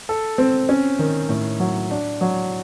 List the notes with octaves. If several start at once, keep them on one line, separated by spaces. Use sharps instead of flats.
A4
C4
C#4
D#3
A2
F#3
D4
F#3